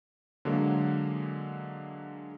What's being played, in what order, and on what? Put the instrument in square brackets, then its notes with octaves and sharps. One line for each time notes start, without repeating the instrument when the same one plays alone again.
[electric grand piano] D3 F#3 G#3 A#3